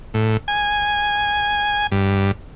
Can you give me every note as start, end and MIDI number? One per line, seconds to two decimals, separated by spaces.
0.14 0.37 45
0.48 1.87 80
1.92 2.32 43